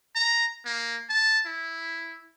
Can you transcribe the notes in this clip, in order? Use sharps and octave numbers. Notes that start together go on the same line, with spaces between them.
A#5
A#3
A5
E4